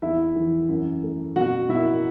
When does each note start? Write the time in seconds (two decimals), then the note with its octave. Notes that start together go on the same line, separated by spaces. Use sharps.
0.02 E2 E4 E5
0.36 E3
0.69 F#2
1.03 A3
1.36 B2 F#4 F#5
1.69 B2 E4 E5